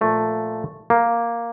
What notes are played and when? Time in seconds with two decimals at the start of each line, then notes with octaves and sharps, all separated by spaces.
0.01 A#2 F3 A3
0.90 A#3